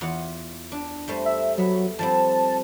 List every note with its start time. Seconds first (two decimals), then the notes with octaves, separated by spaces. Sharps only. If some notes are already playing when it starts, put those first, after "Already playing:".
0.01 E2 F4 F#5
0.72 D4
1.08 G3 A3 C5
1.25 E5
1.58 F#3 B3 E5
1.99 F3 G3 C4 A5